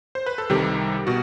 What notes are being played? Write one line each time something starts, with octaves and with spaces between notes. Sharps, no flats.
C5
B4
A4
C2 C3 D#3 G3 G4
B2 F#4